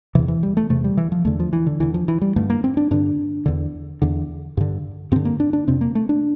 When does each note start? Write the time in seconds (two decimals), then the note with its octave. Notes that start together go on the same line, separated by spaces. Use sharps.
0.15 E2 C3 E3
0.28 E3
0.43 G3
0.57 A3
0.69 E2 C3 A3
0.84 G3
0.97 E3
1.12 F3
1.25 E2 D3 A3
1.40 F3
1.53 E3
1.67 D3
1.80 E2 D3 E3
1.94 F3
2.08 E3
2.21 G3
2.36 G2 D3 A3
2.50 A#3
2.64 C4
2.77 D4
2.91 G2 D3 D4
3.46 E2 D3
4.02 E2 D3
4.57 G2 D3
5.12 G2 D3 C4
5.25 A#3
5.40 D4
5.53 D4
5.67 F2 C3 C4
5.81 A#3
5.95 A3
6.09 D4